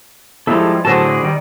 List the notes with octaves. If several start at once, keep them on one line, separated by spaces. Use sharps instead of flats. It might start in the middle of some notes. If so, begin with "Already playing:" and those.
F3 G3 G#3 D#4 E4 G4 A4
A2 D3 F#3 F#4 G#4 A4 C5 A5
D5
D3 D#3 G3